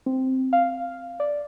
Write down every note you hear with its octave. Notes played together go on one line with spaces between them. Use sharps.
C4
F5
D5